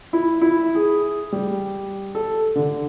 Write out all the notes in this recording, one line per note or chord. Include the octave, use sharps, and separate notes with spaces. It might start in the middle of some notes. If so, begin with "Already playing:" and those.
E4
E4
G#4
G3
A4
D3